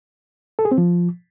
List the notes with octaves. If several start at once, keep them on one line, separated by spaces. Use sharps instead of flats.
A4
G#4
C4
F3